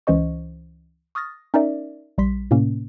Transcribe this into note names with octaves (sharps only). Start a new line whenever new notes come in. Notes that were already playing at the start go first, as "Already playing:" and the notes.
C#2 E3 C#4 C5 D#5 C#6
C#6 D#6 F6 A6 A#6
C#4 D#4 A#4 D5 E5
A#1 G3 C6 B6
A2 C3 A#3 C#4